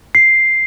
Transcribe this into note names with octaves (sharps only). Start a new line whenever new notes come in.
C7